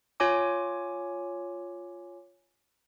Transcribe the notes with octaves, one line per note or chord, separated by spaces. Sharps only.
F4 C#5 G#5 D6